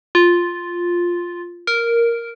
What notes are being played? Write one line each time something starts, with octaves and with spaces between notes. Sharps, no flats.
F4
A#4